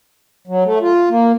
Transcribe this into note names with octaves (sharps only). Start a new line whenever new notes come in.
F#3
A3
F4
A#3